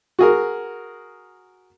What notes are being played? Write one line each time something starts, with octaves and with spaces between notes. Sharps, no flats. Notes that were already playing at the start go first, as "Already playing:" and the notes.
F#4 G#4 A#4